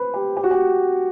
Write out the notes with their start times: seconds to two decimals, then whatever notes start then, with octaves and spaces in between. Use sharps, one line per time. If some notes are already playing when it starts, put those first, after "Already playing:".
Already playing: B4 C5
0.14 G4
0.37 G4
0.43 F#4
0.51 G4